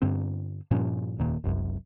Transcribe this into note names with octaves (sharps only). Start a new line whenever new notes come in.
G2 D3 C4
G2 A#2 F3 C#4
F1 D#2 A#2
F#1 C2 F#2